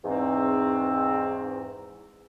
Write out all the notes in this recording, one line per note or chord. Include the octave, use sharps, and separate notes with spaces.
E2 G#2 C4